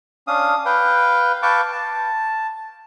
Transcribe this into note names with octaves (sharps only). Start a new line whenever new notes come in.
C#4 D4 F5 D#6
B4 F5 G5
B4 F5 G5 A5 C#6 D6
A5